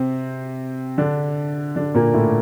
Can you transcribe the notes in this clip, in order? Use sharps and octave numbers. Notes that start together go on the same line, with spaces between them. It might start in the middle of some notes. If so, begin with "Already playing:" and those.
Already playing: C3 C4
D3 D4
D3 D4
A#2 A#3
A2 A3